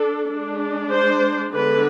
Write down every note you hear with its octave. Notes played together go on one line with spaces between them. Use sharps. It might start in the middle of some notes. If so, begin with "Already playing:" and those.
Already playing: D4 A4
G#3 D4
C5
D3 G#3 B3 D4 B4